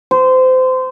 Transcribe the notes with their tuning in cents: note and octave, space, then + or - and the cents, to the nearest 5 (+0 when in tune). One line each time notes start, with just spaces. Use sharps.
C5 -25